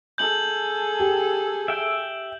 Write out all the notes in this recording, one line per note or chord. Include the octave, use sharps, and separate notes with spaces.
G#4 A4 G6 F#7
G4
E5 G5